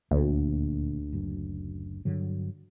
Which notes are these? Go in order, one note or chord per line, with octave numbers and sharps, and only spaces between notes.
D#1 D2 D3 A#3
F#1 F#2
G2 D3 F#3